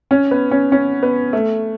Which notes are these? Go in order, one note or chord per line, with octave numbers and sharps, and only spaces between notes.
C#4
B3
C#4
C#4
B3
A3